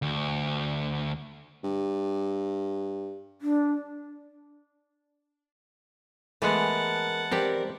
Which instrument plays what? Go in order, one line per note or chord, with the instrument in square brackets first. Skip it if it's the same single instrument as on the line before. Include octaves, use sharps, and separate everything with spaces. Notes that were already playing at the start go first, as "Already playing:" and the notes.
[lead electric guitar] D2
[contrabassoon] G2
[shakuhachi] D4
[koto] E3 G#3 B3 [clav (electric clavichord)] A3 [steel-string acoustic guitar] A#4 [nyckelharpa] F#5 A5
[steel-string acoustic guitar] G3 A#4 [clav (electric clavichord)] C4 G4